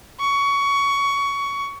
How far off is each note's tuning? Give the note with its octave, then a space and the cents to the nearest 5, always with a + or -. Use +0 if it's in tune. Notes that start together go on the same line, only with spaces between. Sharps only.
C#6 +20